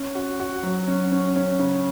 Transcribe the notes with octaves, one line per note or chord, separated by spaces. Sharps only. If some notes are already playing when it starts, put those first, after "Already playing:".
Already playing: C#4
F#4
F#4
F#3
C#4
C#4
C#4
C#3